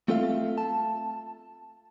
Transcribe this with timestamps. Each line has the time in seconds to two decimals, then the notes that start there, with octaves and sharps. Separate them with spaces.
0.08 A3 C4 F4 A4 E5 F5
0.58 A5